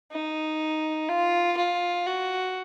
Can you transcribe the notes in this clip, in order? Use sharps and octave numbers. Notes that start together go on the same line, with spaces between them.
D#4
F4
F4
F#4